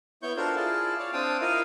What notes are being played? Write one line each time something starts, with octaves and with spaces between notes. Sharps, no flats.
B3 E4 C#5 C#6 G6
D4 F4 F#4 A4 A#4 C5
E4 F4 G#4 D5 A5
C#5 D5 F5
C4 D4 F5 G5 A5 D#6
E4 F4 A#4 D#5 F5